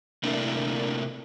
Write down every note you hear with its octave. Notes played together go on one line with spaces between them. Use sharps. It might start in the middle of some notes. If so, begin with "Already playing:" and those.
C3 A3 A#3 D4 E4 A#4